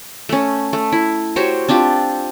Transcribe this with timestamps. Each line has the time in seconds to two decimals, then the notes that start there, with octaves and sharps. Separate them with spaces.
0.29 A3 C#4
0.73 A3
0.92 E4
1.36 F#4 G4 C5 C#5
1.69 C4 D4 F4 G4